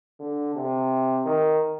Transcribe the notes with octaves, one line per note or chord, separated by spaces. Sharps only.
D3
C3
D#3